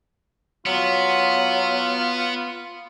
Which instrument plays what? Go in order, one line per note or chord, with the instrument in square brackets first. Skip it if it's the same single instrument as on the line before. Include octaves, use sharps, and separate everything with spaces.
[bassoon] F#3 [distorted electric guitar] B3 [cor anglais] F4